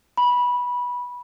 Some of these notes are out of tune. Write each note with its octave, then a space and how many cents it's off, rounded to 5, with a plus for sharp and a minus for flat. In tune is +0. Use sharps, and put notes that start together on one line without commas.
B5 -15